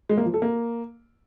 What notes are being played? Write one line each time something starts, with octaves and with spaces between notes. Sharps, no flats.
G#3
A#3
F3
A4
A#3